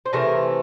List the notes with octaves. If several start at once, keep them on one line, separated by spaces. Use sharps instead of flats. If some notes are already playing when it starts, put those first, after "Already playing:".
C5
C3 E3 A3 A#4